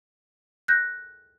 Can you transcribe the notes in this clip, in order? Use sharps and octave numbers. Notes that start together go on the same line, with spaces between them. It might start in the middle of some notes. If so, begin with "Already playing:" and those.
F#6 G6 A#6